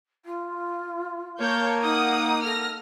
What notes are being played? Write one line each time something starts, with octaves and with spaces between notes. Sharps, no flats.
F4
A#3 C#5 A5 G6
D#4 F#5 D#6
A4 F6 A#6